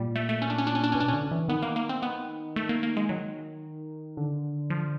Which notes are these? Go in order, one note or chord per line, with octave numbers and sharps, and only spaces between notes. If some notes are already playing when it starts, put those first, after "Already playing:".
Already playing: A#2 G3
A3
A3
C#4
D4
C#4
D4
C#4
D4
B2 C#4
D4
C#4
D3
E3
D#3 B3
A#3
A#3
C4
B3
A3
A#3
A#3
G#3
D#3 F#3
D3
F3